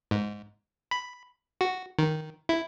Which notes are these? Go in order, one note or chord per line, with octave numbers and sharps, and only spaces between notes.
G#2
B5
F#4
D#3
E4